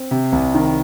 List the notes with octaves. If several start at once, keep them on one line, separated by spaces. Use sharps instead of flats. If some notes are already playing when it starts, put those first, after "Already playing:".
Already playing: C4
C3
C2
D#3